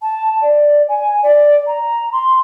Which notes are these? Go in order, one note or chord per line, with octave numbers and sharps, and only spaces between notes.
A5
D5
G#5
D5
A#5
C6